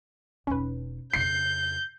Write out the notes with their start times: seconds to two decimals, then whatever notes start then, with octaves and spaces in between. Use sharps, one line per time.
0.47 E1 C#4 D#4 B4
1.14 F2 C#3 G6 C7